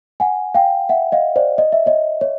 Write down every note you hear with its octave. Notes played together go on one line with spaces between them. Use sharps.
F#5 G#5
F5 G5
E5 F#5
D#5 F5
C5 D5
D#5
E5
C#5 D#5
C#5